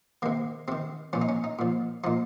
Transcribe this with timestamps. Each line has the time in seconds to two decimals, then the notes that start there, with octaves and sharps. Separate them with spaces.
0.22 C3 D#3 A#3
0.68 C3 D#3 C4
1.13 A#2 F3 C#4
1.22 D#4
1.29 C#4
1.44 D#4
1.59 A#2 F3
2.04 A#2 F3 D#4